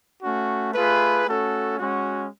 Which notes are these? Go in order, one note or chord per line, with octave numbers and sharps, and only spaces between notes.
A3 C#4 F#4
A3 F4 G#4 B4
A3 C#4 F#4 A4
G#3 C#4 F#4